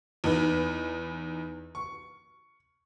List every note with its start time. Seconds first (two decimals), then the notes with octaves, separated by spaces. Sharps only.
0.24 E2 D#4 B4
1.75 C#6